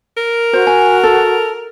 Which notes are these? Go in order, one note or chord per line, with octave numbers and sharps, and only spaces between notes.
A#4
F#4 C5
G#5
A4